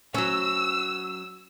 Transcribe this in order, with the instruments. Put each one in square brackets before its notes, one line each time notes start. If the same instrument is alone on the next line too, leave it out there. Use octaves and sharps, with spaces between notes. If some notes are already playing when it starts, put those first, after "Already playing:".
[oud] F#3 C#4 [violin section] E6